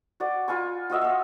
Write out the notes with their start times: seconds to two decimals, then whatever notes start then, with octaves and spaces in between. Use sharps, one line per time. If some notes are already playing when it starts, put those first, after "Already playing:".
0.20 F#4 D5
0.48 F4 B4 G#5 C#6
0.90 F4 F#4 D#5 E5
1.01 E5 D#6